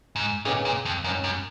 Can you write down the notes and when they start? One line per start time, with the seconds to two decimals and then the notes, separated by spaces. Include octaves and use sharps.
0.16 G#2
0.45 A#2 D#3 A#3 C#4 G#4 B4
0.65 A#2
0.85 F2
1.04 F#2 D#3 F#3 C#4
1.24 F#2